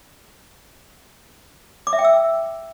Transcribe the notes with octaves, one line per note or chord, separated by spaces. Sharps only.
D6
E5
G5
E6